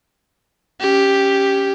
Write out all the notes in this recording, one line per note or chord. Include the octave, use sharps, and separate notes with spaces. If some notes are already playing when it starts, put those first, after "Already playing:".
C#4 G4